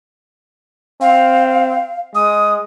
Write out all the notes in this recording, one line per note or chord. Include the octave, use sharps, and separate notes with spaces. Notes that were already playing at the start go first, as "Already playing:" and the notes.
C4 F5
G#3 D#6